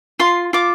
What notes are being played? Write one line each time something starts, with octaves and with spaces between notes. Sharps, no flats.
F4 C6
F4 D6